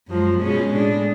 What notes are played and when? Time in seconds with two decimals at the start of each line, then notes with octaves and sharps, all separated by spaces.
0.08 F#2 F3 G#3
0.42 B2 G#3 C#4
0.74 A2 G#3 D4